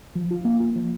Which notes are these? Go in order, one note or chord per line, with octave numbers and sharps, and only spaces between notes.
F3
F4
A#3
F4
F3